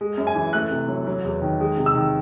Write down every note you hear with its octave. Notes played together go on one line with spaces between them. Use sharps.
G#3
F#2
G#5
E3
A3 F#6
C3
F#3
F#3
E2
D#3
G#3
C3
E6
D#3